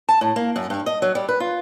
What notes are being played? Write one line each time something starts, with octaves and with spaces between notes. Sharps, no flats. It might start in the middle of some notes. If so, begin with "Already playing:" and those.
A5
A2
A#3
F#2
G2
D#5
F#3
G3
B4
F4